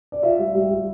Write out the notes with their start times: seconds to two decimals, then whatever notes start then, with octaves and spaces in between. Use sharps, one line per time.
0.12 D5
0.23 F4 E5
0.39 G3
0.55 G3
0.70 G3